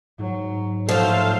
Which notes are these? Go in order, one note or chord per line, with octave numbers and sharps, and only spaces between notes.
G#2 F#3
A2 F3 F#3 A3 A4 C5 F5